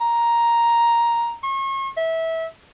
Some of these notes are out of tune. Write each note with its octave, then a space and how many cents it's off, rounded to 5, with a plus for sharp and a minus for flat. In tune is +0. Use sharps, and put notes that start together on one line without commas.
A#5 +5
C#6 -40
E5 -20